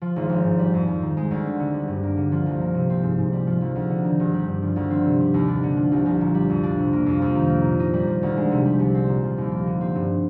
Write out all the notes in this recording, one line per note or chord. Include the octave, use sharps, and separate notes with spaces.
F3
G#1
G#1
G#2
G3
F2
F2
D#3
G#3
D2
C4
D3
G3
G2
A#3
D3
F3
C2
A#3
C3
C4
G#2
G#2
G3
F3
D2
D2
D3
D#3
G1
G3
G2
F3
D2
C4
C3
G3
D#2
D4
D3
F3
C2
C2
A#2
G3
F2
D4
C3
A#3
F2
F2
D#3
A#3
A#2
D#4
G3
F3
D2
G#3
C3
G3
C2
C4
A#2
F3
D#2
A#3
D3
C4
G2